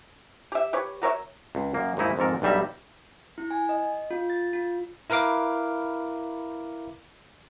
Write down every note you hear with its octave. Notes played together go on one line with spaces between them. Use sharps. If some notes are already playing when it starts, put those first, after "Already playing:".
G4 E5
G4 B4 C#5
F#4 A#4 C#5 E5
C#2
F#2 A#3
D#2 G#2 D#4 E4
F2 G#2 A4 A#4
B1 G2 G3 E5 A#5
E4
G#5
D#5
F4
A6
F4
E4 A#4 B4 F5 D6